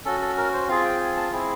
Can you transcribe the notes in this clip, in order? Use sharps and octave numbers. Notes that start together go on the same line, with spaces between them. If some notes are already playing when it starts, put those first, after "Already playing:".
C#4 F#4 A4
A4
A#4
C5
C4 F4 G#4 F5
G5
G#5
A5
C4 E4 G#4